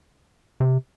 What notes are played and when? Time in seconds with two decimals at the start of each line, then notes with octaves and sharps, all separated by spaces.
0.60 C3